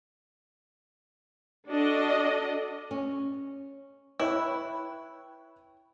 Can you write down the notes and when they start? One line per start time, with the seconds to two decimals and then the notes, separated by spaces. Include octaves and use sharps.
1.68 D4 F#4 A4 D5 D#5
2.91 C#4
4.20 E4 B4 C#5 G5